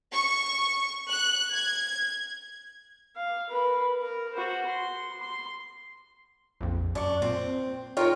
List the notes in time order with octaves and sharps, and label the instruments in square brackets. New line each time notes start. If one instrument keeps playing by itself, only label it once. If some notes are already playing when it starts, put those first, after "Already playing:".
[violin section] C#6
F#6
G#6
[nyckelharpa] F5
A#4 B4
A#4
F#4 C5
C6
C6
[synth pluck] A#1 F2
[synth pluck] F#2 C#6 [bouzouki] D4
[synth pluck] A#2 [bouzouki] C4
[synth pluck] D#4 A#4 [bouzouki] F4 C#5 G5